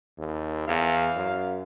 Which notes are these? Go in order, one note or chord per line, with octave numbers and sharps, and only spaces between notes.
D#2
E2 F5
F#2